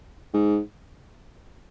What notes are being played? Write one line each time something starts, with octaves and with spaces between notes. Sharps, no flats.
G#2